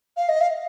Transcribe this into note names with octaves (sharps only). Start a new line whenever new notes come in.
F5
D#5
F5